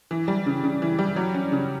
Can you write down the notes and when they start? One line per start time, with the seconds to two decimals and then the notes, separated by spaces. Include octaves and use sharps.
0.11 E3
0.28 G3
0.46 C#3
0.63 C#3
0.82 E3
0.99 G3
1.16 F#3
1.35 C#4
1.52 C#3